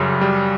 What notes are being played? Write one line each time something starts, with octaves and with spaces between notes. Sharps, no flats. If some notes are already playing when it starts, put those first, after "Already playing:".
Already playing: F#2 C#3 G3
G3